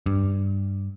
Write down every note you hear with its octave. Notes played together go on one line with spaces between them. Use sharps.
G2